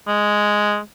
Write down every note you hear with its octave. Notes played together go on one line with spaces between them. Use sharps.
G#3